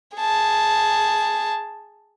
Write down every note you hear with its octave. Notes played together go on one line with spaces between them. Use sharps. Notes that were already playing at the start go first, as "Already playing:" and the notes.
G#4 A5